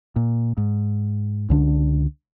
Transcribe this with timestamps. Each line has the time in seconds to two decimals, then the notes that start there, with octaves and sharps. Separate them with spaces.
0.16 A#2
0.57 G#2
1.50 C#2 D3 D4